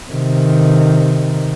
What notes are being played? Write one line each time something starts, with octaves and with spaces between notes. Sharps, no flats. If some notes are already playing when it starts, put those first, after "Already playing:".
C3 D#3